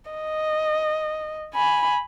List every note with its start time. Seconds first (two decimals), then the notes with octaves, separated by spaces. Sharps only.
0.11 D#5
1.55 G#5 B5